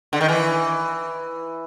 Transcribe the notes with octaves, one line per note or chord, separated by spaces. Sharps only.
D3
D#3
E3